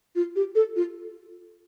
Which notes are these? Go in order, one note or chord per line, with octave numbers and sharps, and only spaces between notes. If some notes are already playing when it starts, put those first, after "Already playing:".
F4
G4
A4
F4